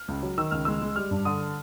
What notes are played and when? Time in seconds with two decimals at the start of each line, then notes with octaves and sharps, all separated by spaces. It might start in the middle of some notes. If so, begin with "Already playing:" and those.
Already playing: F6
0.08 C#2
0.23 F#3
0.37 D#3 E6
0.51 C#2 F6
0.65 G#3 E6
0.82 G#3
0.96 G3 F6
1.11 G2
1.25 D3 D#6